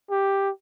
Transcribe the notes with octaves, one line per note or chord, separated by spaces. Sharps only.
G4